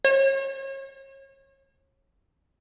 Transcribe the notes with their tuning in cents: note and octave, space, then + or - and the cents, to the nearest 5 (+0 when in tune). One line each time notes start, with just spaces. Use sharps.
C#5 -35